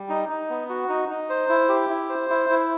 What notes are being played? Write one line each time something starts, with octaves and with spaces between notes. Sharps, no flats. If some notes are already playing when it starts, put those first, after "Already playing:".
Already playing: G3
D#4
D#4
B3
F#4
D#4
D#4
C5
E4
G4
E4
C5
E4
E4